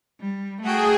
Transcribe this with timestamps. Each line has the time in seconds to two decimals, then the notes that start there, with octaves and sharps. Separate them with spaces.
0.21 G3
0.62 A3 F#4 G#4 G5